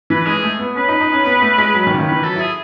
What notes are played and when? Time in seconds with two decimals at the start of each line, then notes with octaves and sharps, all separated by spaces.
0.10 E3 B4
0.26 G#3 G#4
0.43 A3
0.59 B3
0.76 C#4 B4
0.88 D#4
1.01 D#4
1.13 C#4
1.26 B3
1.42 A3
1.58 G#3
1.74 F#3 B4
1.87 D#3
1.93 C#3
1.99 D#3
2.08 E3 B4
2.23 F#3 A4
2.36 E4 G#4